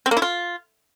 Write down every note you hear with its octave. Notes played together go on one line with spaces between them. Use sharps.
C4
A#3
E4
F4